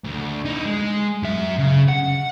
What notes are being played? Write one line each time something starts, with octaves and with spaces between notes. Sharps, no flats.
D2
D#4 E4
G#3
F#2 E5
C#3
F#5